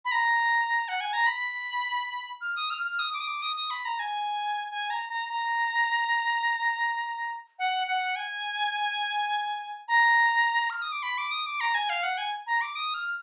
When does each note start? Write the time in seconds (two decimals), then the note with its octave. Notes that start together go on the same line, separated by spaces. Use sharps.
0.05 B5
0.12 A#5
0.88 F#5
1.01 G#5
1.13 A#5
1.26 B5
2.41 F6
2.56 D#6
2.70 F6
2.84 F6
2.99 D#6
3.13 D6
3.21 D#6
3.28 D6
3.42 D#6
3.56 D#6
3.70 B5
3.85 A#5
3.99 G#5
4.71 G#5
4.90 A#5
5.09 A#5
5.29 A#5
7.59 F#5
7.87 F#5
8.16 G#5
9.88 A#5
10.70 F6
10.82 D#6
10.92 D6
11.03 B5
11.18 D6
11.31 D#6
11.46 D6
11.61 A#5
11.75 G#5
11.89 F5
12.03 F#5
12.18 G#5
12.47 A#5
12.61 D6
12.76 D#6
12.94 F6